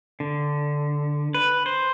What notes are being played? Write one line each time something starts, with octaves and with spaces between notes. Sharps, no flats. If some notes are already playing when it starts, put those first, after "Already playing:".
D3
B4
C5